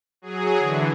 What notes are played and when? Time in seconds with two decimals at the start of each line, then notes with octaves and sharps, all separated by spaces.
0.22 F#3 G#4
0.59 D3 E3